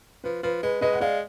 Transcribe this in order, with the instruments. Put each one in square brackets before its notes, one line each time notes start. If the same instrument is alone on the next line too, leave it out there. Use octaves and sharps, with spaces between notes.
[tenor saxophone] F3 [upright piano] B4
[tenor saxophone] F3 [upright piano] B4
[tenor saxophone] G#3 [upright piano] B4
[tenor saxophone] G#3 [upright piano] B4 D#5
[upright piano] F#5
[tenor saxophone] G#3 [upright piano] D5 F5